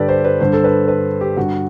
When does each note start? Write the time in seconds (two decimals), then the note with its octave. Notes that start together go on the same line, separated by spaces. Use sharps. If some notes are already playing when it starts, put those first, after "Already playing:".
Already playing: G2 D3 G4 A4 B4 D5
0.08 C5
0.25 B4
0.40 G2 D3 C5
0.53 A4
0.64 B4
0.88 B4
1.21 G4
1.37 G2 D3 F#4